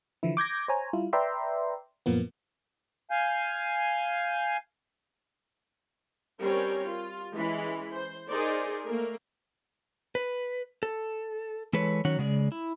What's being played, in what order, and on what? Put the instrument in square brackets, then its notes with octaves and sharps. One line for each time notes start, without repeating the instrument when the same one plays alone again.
[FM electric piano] D3 E3 F3 E4
D6 G6 G#6 A#6
C5 C#5 G#5 A#5
G3 E4 F4
B4 D5 E5 G5 A#5 C6
F#2 A#2 F3 A#3 B3
[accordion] F5 G#5 G6
[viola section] G3 C4 C#4 A#4 C#5
F4
E3 G#3 C#4 B5
C5
D#4 G#4 A#4 C5 D5
A3 A#3 A#4
[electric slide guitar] B4
A4
E3 G#3 A4 B4 C#5
D#3 F#3 C#4 C#5 F#5
C#3 G#3 G#4 D5
E4